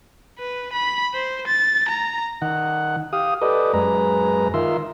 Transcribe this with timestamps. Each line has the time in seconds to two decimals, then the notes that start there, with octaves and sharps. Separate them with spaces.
0.39 B4
0.73 B5
1.14 C5
1.47 A6
1.89 A#5
2.42 D#3 F#5
3.13 G4 F5 D#6
3.41 G4 A4 B4 D5 D#5
3.73 F#2 G#3 B4 A#5
4.54 D#3 F4 A#4 E5 C6